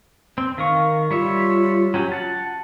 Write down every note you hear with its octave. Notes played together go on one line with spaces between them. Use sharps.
C4
D#3 A#4 F5 C#6
G3 F4 C#5 E5
F#3 C#4 G4
F#5 A5